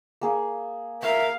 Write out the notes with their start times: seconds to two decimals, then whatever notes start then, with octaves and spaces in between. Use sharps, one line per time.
0.21 A#3 G#4
1.03 A#4 E5 F5